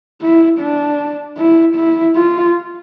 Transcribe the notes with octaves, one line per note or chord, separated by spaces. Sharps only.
E4
D4
E4
E4
F4